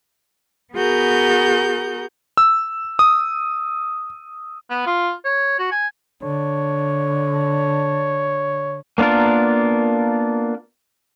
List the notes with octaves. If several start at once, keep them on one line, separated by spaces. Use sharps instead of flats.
B3 F#4 G#4 A#4 G6
E6
D#6
B3
F4
C#5
F#4
G#5
D3 C#5
A#3 B3 D4 F4 A#4